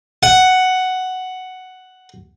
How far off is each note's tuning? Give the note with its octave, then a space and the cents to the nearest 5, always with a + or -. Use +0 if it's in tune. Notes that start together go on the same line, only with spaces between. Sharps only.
F#5 +5